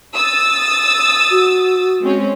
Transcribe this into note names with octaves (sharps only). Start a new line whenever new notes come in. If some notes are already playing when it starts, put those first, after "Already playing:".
D#6 E6 A6
F#4
G#3 C4 C#4